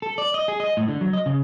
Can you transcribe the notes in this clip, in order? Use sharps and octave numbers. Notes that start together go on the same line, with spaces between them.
A4
D5
D#5
G#4
D#5
A2
D3
F#3
D#5
C#3